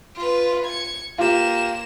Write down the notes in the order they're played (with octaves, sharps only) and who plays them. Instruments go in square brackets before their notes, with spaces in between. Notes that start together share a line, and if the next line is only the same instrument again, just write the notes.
[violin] F4 B4
G#6 C#7
[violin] A#3 E7 [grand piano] F4 G4